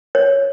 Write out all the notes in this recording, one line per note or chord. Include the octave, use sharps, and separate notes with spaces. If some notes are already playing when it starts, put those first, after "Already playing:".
C#5